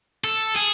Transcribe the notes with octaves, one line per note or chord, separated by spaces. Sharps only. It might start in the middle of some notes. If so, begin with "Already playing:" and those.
A4
G#4